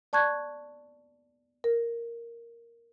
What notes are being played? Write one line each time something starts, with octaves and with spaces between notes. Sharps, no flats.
D5 A5 C#6 F#6 G#6
A#4